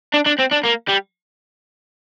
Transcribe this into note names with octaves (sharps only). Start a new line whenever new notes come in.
D4
D4
C4
D4
A#3
G3